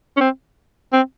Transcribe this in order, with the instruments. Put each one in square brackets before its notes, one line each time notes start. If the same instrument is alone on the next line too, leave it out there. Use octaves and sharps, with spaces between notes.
[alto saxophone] C#4
C4
C4